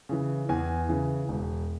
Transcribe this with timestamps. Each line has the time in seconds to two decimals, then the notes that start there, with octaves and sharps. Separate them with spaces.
0.09 C#3 E3
0.49 E2 G#5
0.89 C#3 E3
1.29 E1